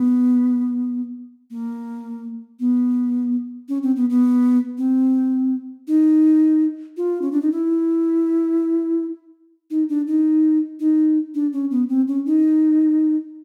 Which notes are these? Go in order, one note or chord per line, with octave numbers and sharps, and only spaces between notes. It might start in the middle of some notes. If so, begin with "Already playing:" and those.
Already playing: B3
A#3
B3
C#4
C4
B3
B3
C4
D#4
F4
C#4
D4
D#4
E4
D#4
D4
D#4
D#4
D4
C#4
B3
C4
C#4
D#4